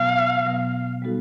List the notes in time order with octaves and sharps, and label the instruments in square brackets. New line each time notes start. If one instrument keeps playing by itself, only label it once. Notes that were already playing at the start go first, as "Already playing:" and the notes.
Already playing: [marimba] B2 F#3 B3 [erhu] F5
[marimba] B2 F#3 B3
G3 B3 D#4 F#4 A4